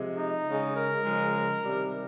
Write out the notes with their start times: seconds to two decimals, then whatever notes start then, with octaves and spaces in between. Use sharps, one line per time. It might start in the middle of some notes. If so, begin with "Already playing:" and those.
Already playing: C3 F3 G#3
0.17 D#4
0.46 C#3 G#3
0.75 A#4
1.04 C#3 F3 G#3
1.64 C3 D#3 G3